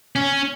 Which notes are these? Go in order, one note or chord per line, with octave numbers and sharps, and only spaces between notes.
C#4